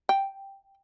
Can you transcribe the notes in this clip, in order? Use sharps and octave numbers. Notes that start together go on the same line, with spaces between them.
G5